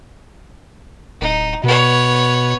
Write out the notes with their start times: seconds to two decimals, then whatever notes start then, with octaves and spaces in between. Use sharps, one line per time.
1.21 D1 D#4
1.63 B2 B3 C#5